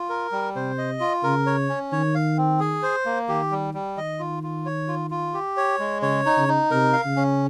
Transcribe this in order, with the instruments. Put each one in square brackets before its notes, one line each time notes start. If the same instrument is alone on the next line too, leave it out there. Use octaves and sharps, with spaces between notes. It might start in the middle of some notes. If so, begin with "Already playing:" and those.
Already playing: [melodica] F4
A#4
G3
[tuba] C3 [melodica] C5
[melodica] D#5
F4
[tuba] C#3 [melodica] A#4
[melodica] C#5
C#4
[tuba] D#3 [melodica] C#5
[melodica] F5
C4
G#4
C5
A#3
[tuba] D#3 [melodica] G4
[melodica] G3
G3
[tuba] D#3 [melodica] D#5
[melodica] F4
F4
C#5
F4
F4
G4
C#5
G#3
[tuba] C#3 [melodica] C#5
[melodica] D#4
[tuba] C#3
[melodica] D#4
[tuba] C3 [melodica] A#4
[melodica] F5
[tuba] C#3
[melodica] C#4